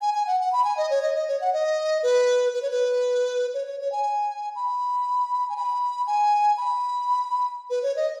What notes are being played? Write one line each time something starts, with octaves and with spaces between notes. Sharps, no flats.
G#5
G#5
F#5
F#5
B5
G#5
D#5
C#5
D#5
D#5
C#5
F#5
D#5
B4
B4
C#5
B4
C#5
C#5
C#5
G#5
B5
G#5
B5
G#5
B5
B4
C#5
D#5